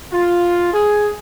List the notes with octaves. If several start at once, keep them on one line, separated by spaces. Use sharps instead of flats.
F4
G#4